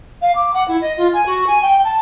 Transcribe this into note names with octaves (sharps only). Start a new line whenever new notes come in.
F5
D6
F#5
E4
D#5
F4
G#5
F#4
G#5
G5
A5